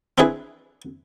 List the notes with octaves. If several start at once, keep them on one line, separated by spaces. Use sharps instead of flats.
C4 D4 E4 G#4 B4